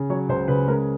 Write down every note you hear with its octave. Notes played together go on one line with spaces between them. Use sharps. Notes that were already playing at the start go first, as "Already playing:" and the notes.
Already playing: C#3
F#3 C#5
C#2 C5
C#3 B4
G#3 A#4